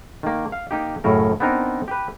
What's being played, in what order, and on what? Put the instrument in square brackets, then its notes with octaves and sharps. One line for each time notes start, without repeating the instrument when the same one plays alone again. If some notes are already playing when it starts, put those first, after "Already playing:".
[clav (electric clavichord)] D#3 A#3
F5
A#3 D#4 G4
F#2 A2 C#3 A#4
B3 C4 D4 D#4 A#4
G4 B4